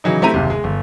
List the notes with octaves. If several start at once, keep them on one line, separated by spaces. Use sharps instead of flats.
C#3 E3 F#3 D#4
A3 C4 E4 G4 A#5 D#7
F#1 D#2 C3
G#3
G1